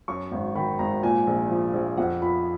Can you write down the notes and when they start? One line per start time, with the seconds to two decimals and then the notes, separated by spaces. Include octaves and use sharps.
0.08 F#2 C#6
0.31 G#1
0.55 D#3 B5
0.79 G#1 A#5
1.03 A#2 G#5
1.27 A#1
1.50 F3
1.73 A#1
1.97 F2 F#5
2.22 F3 B5